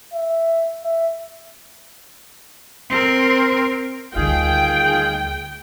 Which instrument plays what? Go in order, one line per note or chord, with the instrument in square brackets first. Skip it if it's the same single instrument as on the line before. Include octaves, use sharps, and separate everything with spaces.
[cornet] E5
E5
[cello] C4 A#4
[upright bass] D2 G3 [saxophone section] D#3 F4 G#4 [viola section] G5